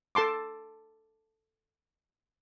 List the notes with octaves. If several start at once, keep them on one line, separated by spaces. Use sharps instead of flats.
A4 A5 C6 D6